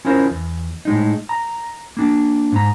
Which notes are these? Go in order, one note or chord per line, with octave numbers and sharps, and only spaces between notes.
C#4 E4 F4 A#4 C5
E2
A2 G#3 D#4
A#5
A#3 D4
G#2 A#5